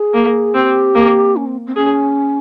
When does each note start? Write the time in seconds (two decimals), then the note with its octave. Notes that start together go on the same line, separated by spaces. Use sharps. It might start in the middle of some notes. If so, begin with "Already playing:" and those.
Already playing: G#4
0.14 A#3
0.55 C4 G4
0.95 A#3
1.36 C#4
1.46 C4
1.67 C4
1.76 C#4 G#4